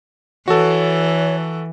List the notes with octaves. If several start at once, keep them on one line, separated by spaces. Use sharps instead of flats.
E3 F#4 A4 C#5